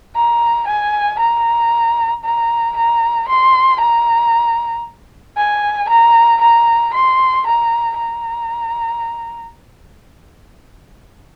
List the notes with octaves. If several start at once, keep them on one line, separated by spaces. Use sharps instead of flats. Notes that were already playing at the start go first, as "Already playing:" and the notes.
A#5
G#5
A#5
A#5
A#5
C6
A#5
G#5
A#5
A#5
C6
A#5
A#5